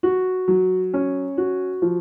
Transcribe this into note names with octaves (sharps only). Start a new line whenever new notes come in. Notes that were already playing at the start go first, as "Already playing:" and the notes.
F#4
F#3
C#4
F#4
F3